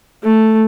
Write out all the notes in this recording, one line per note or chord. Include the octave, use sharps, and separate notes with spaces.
A3